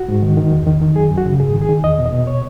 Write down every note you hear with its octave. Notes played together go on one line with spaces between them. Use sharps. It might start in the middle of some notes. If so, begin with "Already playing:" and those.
Already playing: F#4
G#2
D#3
D#3
E2
D#3
D#3
F#2 G#4
F#2
F#4
C#3
G#2 G#4
D#3
G#4
D#3
E2 D#5
B2
D#5
B2
C#5